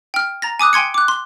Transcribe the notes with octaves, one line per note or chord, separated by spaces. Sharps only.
G5 F6
A#5 A6 A#6
G#5 D6 D#6 F#6
G5 G#5 C6 G#6 C#7
D6 F#6
C6